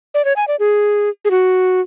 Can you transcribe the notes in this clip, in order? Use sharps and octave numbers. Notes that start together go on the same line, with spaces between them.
D5
C#5
G#5
D5
G#4
G#4
F#4